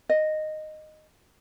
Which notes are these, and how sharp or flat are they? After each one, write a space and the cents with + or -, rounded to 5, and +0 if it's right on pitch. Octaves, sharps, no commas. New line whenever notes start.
D#5 -10